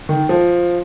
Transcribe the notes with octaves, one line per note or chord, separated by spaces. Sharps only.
D#3
F3